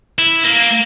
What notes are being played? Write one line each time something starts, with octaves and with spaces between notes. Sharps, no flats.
E4
A#3